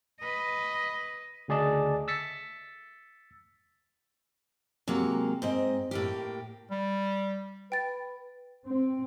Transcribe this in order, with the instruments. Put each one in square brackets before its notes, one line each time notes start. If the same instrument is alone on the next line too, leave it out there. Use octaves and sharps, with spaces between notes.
[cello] B4 D#5
[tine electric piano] D2 C#3 G#4 D5 D#5 A5
E6 A6 B6 C#7
[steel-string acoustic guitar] C3 F#3 G#3 A#3
G#2 C4 D#5
A2 A#3 G4
[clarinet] G3
[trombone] B4 [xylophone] G5 A6
[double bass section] C4